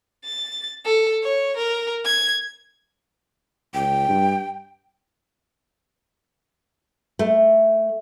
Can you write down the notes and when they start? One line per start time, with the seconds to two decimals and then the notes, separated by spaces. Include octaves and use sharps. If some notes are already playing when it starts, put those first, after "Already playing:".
0.25 A6
0.85 A4
1.23 C#5
1.57 A#4
2.05 G#6
3.74 C#2 G5
4.09 G2
7.19 A3